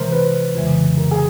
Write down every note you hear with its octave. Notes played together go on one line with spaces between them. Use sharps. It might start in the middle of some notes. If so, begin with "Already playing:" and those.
Already playing: C3 E3 G#3 A#4 C5
B4
F2 C#3 E3 G#3
A#4
G#4